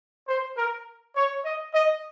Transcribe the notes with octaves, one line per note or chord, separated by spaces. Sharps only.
C5
A#4
C#5
D#5
D#5